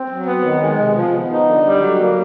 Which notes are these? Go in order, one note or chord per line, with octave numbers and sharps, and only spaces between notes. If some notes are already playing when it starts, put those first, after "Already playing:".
Already playing: C4
F#3
B3
D#3
G#3
C3
F3
B3
D#4
D3
G3
F#3
A#3